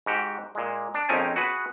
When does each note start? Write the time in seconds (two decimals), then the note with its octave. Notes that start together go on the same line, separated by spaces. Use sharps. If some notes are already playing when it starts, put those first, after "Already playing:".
0.06 G#2 F#4 G4
0.55 A#2 G#3
0.95 D4
1.09 A#1 F2 C4 C#4 D#4 G#5
1.36 F#4 G#4 B4 F#5